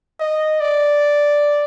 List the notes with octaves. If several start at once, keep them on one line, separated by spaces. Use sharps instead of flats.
D#5
D5